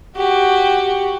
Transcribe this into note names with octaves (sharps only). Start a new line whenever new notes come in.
F#4 G4